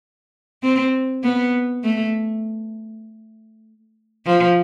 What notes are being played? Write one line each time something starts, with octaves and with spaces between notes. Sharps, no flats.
C4
B3
A3
F3